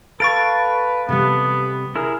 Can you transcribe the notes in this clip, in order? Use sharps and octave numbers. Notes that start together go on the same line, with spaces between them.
A4 B4 F5 C#6 A6 D7
C3 G3 B3
E4 G#4 A#4 F6